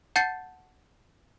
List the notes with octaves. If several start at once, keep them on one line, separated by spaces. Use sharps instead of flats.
F#5 A5 G6 A6 C7 C#7